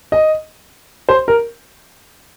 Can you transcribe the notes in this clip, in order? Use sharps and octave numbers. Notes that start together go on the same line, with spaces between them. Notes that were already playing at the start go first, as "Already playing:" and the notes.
D#5
C5
A#4